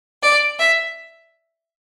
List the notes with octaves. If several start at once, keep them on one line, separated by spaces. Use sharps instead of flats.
D5
E5